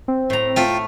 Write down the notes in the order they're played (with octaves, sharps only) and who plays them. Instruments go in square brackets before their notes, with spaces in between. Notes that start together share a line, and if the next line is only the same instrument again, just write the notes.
[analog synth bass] C4
[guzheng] A2 A#5
[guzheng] A3 [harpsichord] F4 G5